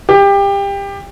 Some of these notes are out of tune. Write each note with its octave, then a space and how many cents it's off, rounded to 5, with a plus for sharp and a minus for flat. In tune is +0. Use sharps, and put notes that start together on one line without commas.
G4 +25